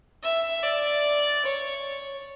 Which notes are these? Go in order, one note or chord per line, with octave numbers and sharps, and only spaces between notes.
E5
D5
C#5